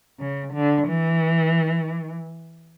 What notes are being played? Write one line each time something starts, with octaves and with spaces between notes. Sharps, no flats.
C#3
D3
E3